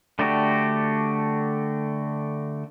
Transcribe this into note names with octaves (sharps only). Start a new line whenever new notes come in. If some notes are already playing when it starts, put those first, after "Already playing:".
D3 A3 D4 F#4 G4